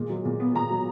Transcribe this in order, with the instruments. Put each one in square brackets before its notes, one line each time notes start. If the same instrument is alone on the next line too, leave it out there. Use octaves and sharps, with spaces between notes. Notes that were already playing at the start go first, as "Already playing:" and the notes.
Already playing: [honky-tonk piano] A#2 G#3
F#3
A#2
B3
A#2 A#5
F#3